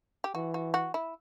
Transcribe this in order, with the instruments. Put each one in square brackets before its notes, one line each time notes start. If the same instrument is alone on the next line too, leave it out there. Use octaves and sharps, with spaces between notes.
[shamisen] G4
[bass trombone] E3 [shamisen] F#4
[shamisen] F#4
F#4
E4